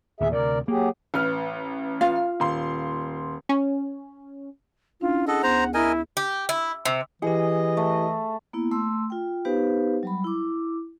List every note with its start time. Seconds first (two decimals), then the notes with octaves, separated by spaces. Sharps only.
0.20 D1 D#2 G#4 E5
0.32 D2 C3 A#4 D5
0.68 F#3 A#3 G4 G#4
1.14 A1 B4 F6
2.01 F4 F5
2.40 D#1 C6
3.49 C#4
5.01 C#4 D4 E4 F4
5.28 G#4 A4 D#5 F#5
5.43 D2 B3 C5 A#5
5.74 E4 A#4 D#5 G#5 G6
6.17 G4
6.49 E4
6.85 C3
7.22 E3 E4 G4 G#4 D#5
7.77 A3
8.53 A#3 B3 E4
8.71 A3 C6 E6
9.10 F4 G5
9.45 B3 D#4 G4 B4 C5 F5
10.03 F#3 G3 B5
10.24 E4 D6